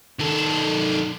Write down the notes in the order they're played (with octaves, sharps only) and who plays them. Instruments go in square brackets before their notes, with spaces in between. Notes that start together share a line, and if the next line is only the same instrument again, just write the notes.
[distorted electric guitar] D#3 A4